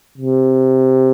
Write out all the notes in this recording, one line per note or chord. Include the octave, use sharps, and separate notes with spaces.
C3